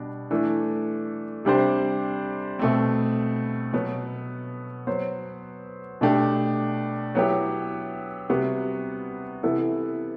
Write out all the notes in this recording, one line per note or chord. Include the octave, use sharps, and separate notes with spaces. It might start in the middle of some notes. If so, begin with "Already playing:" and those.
Already playing: B2 G3 D4
E3 A3 D4 A4
C3 G3 D4 G4 C5
B2 A3 C4
B2 F#3 B3
F#3 B3 F#4 C5
B2 A3 D4 G4
F#3 B3 E4 G4
C3 G3 B3 F#4
C3 E3 B3 E4 A4